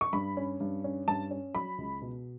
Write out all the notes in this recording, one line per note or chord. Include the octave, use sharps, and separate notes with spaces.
C#6
G2 B5
C#4
G2
C#4
G2 A5
C#4
F#3 B5
C#2
B2